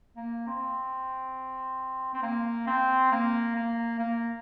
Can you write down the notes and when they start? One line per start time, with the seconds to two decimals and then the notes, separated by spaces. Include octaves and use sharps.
0.17 A#3
0.47 C4
2.14 C4
2.23 A#3
2.67 C4
3.12 A#3
3.56 A#3
3.99 A#3